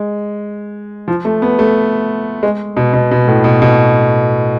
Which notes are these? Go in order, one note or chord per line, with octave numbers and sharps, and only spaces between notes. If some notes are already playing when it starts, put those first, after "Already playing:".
Already playing: G#3
F3
A3
B3
A3
G#3
B2
B2
B2
A2
B2
B2